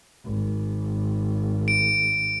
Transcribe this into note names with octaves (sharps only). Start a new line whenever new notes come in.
G#1
D7